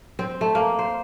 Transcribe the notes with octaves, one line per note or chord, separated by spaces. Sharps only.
C4
A3
A#3
C5